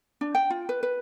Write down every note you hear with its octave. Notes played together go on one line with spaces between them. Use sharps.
D4
G5
F4
B4
B4